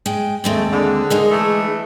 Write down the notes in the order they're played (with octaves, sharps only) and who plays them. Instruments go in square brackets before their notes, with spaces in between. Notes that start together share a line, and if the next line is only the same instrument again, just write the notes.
[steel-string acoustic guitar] G#3 G5
[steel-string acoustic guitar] D#2 G#3 C4 [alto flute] A3
[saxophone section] D3 [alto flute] G#4
[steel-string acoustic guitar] G#3 D#4 A#4
[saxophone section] E3 A3